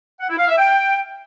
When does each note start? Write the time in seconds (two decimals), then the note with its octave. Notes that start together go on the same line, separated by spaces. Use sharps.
0.20 F#5
0.29 E4
0.39 F5
0.48 E5
0.57 G5